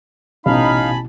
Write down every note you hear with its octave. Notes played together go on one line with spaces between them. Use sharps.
A1 B2 D#4 F5 G#5 A5 B5